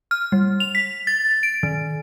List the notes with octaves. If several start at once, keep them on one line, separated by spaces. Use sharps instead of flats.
F6
G3
F7
B6
A6
D7
D#3